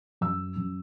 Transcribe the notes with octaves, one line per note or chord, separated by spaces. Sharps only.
F#2 E6
F#2